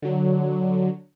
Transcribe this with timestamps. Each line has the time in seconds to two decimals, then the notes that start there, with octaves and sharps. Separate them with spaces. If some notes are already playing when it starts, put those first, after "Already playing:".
0.02 D3 F#3